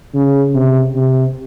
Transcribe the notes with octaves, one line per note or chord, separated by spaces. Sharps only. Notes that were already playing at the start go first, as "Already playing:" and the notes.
C#3
C3
C3